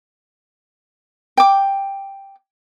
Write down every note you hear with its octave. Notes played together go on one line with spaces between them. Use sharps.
G5 D6